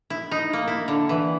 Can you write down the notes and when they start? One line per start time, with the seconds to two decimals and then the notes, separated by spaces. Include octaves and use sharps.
0.10 E4
0.31 D#4
0.53 A#3
0.68 E4
0.88 D3
1.09 E3